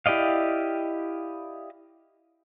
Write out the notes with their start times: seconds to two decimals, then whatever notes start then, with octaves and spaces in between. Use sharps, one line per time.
0.06 E4 G4 D5 D#5 F5